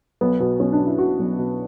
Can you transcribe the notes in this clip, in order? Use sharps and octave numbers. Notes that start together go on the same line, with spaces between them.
B1 B3
B2 B3
B1 C#4
D4
B2
E4
B2 F#4
B1
B2